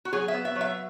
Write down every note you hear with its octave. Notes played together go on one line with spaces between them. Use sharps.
F#4
F#3 G#4
E5
B3
E5
F#3
E5